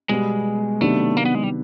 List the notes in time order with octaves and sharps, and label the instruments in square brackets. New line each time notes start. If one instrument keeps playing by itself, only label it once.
[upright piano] B2 G3 B3 [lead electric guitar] G#3
[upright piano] C3 D#3 F#3 B3 D4 [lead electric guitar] A3
[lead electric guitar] A#3
B3
G#3
G3